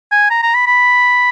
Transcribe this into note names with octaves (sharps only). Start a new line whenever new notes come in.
G#5
A#5
A#5
B5
B5